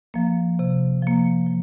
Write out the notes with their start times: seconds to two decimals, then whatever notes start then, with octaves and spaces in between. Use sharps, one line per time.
0.14 F3 A#3
0.59 C3
1.02 F3 A#3
1.47 F3